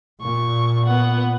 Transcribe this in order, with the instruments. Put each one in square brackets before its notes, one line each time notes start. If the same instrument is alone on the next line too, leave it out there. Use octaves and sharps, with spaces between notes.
[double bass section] A#2 [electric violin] C#6
[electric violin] B3 F#5